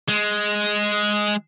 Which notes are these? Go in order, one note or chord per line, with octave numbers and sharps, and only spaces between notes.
G#3